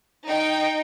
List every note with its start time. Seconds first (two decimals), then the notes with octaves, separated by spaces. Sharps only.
0.25 D#4 G5